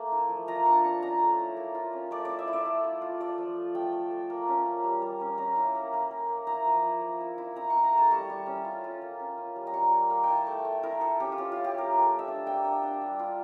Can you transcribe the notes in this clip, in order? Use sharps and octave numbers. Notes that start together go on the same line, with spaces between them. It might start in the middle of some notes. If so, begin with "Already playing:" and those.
Already playing: A3 A#3
E4
F3
F4 A#5
D4 C#6
D4 C#6
C#4 A#5
A3
E4
A#3
F4
C#4
A3 D5
E4 D5
E5
E4
D5
A3
F4
F4
A3 D5
F3
A3
A3 G5
A3
A3
A#3
C#4
A#3
G3
G3
C#4
C#4 A#5
E4
A#3
A#3
A#3
A#3
E4 A#5
F3
E4
A#3
E4
E4
E4 A#5
E4 C#6
A#5
A3 A5
G3 C#6
G3
C#4
F4
F4
A#3
C#4
F4
G3
A#5
G3 C#6
A#3
A#3
G5
E4 A5
A3
A3
E4 A#4
E4 A4
C#4 G4
F4
C#4 G4
E4 F4
G4
A#3 A#4
A3
A3
E5
D4
A#3 G5
D4
D4
G3
F4